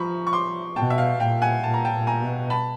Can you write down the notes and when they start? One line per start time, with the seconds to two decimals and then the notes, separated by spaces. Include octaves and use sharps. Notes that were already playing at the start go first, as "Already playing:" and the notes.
Already playing: F3 A#5 B5 C#6
0.27 C#6
0.33 C6 D6
0.76 B2 G5 A5
0.90 E5
0.98 F5
1.20 A#2 F5 G5
1.42 F#5 G#5
1.63 A#2 A5
1.74 A#5
1.85 G5 A5
1.93 A#2
2.07 G#5 A#5
2.22 B2
2.50 A5 B5